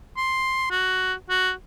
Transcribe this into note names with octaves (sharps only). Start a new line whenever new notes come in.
C6
F#4
F#4